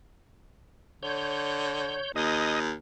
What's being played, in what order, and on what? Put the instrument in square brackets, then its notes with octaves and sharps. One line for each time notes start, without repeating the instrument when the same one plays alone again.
[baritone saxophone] D3 [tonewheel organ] C#5 G6
[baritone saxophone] D#2 [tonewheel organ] D#5 D#6